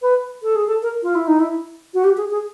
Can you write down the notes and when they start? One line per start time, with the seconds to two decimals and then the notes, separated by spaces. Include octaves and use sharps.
0.02 B4
0.43 A4
0.56 G#4
0.67 A4
0.83 A#4
1.03 F4
1.15 E4
1.28 D#4
1.40 E4
1.94 F#4
2.04 G4
2.17 G#4
2.31 G#4